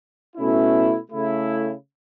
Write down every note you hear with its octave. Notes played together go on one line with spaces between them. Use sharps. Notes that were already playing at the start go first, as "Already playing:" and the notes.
B2 A3 C#4 E4
C#3 A3 E4